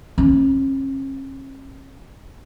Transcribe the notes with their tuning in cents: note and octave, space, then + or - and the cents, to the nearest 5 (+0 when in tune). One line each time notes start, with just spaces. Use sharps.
D3 +0 C#4 -40